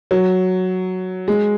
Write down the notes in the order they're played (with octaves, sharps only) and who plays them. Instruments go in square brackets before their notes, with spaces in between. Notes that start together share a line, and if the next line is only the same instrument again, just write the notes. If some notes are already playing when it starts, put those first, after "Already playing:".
[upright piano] F#3
G#3